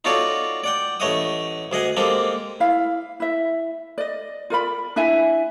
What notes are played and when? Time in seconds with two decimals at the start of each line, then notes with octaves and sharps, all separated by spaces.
0.05 D#4 F4 F#4 A4 C#5 D5
0.64 D5 F#5 G5
1.00 A1 A3 C#5 D#5 F#5 D#6
1.72 D2 G#4 D#5 F#5 G#5
1.97 G#3 A#3 C4 G4 A4
2.60 E4 F5
3.20 E4 E5
3.98 D5 D#5
4.50 F4 A#4 D5 B5
4.96 D4 E4 E5 G#5